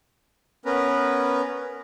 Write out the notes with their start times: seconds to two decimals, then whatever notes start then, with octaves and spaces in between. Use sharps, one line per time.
0.65 B3 C#4 A#4 B4